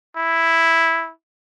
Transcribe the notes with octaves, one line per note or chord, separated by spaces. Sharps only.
E4